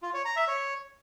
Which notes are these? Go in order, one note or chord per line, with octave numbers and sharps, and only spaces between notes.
F4
C#5
A#5
E5
C#5